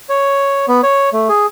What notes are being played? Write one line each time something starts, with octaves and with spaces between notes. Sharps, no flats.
C#5
B3
C#5
A3
G#4